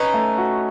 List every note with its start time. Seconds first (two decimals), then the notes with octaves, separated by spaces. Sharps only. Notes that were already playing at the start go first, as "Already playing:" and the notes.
Already playing: C#4 D#4 B4
0.14 A3
0.38 F#4